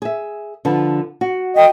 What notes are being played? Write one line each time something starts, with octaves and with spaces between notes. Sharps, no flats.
G#4 E5
D3 F3 B4
F#4
D#5 G5